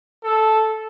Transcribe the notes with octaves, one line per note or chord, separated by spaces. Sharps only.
A4